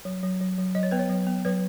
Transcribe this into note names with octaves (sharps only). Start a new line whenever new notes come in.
F#3
F#3
F#3
F#3
F#3 D#5
C#5
B3 B4
C#5
F#3
B3
F#3 B4